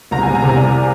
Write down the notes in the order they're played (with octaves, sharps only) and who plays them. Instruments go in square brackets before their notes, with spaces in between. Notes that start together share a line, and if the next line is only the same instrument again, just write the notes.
[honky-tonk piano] C2 A#5
G#5
C2
A#5
C3 G#5
C2 D5